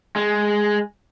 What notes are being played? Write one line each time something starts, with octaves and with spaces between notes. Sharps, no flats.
G#3